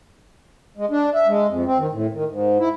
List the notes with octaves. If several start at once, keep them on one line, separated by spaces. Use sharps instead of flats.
G#3
D4
E5
G#3
F2
C4
D#3
A2
D#3
G#2
E4